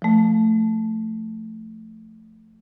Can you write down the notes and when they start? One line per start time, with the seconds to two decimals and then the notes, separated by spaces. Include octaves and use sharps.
0.02 F3 A3